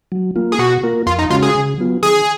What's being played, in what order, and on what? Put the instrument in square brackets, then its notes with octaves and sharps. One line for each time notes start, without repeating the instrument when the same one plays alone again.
[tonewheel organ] F#3
A#3 F4
[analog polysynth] G#4
[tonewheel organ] B2 [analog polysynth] F#4
[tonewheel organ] A#3 F4 A#4
[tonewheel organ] F2 [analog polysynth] F4
[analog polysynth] D#4
[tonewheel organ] C#3 G#3 C#4 F#4 [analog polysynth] F4
[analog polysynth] G#4
[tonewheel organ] C#3
F#3 B3 F4
[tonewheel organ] D#3 [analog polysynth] G#4